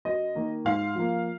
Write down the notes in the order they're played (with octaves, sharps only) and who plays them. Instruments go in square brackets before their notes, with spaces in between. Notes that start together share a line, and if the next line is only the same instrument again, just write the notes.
[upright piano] F#2 D#5
D#3 A#3
G#2 F5
F3 A#3